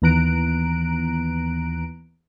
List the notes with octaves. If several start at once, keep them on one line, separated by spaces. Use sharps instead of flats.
D#2 E3 B3 A#5 F#6 D7